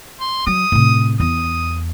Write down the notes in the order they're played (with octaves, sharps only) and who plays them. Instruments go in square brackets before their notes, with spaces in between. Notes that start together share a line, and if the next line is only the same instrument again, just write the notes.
[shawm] C6
[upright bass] F#3 [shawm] D#6
[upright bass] A2 C3
[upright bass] E2 [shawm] D#6